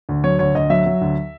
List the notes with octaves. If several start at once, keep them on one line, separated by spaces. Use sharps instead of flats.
D2
F#3 C#5
D2 C#5
D2 D#5
F#3 E5
F#3
D2